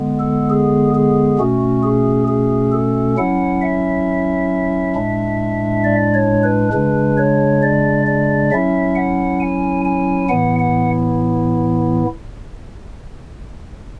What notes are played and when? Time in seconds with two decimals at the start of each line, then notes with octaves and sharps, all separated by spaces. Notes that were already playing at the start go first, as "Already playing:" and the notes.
Already playing: D3 G#3 B3
0.20 A4
0.50 G#4
0.95 G#4
1.39 B2 A3 C#4 F#4
1.83 G#4
2.28 G#4
2.72 A4
3.18 F#3 C#4 E4 F#5
3.62 E5
4.95 A2 G#3 D4
5.84 D5
6.14 C#5
6.44 B4
6.73 C#3 G#3 D4 B4
7.17 C#5
7.63 D5
8.07 D5
8.51 F#3 C#4 E4 E5
8.95 F#5
9.40 G#5
9.85 G#5
10.29 A2 E3 B3 E4 F#5
10.59 F#5